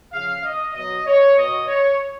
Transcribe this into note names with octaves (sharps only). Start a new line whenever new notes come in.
C#3 F3 F5
D#5
B2 F#3 D#5
C#5
B2 F#3 D#5
C#5